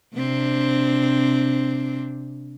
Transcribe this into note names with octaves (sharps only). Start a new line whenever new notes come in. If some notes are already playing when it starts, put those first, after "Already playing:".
C3 C4 D4